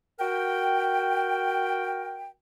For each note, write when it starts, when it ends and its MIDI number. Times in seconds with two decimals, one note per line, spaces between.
0.18 2.28 66
0.18 2.28 70
0.18 2.28 79